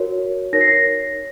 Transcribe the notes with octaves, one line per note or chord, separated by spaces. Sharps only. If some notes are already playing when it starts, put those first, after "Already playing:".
Already playing: F#4 A#4 C#5
D#4 A#4 C#5 A#6
C7
A#6